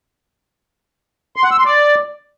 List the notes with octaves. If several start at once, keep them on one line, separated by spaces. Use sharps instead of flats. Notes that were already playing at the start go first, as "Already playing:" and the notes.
C6
F#5
E6
C6
D5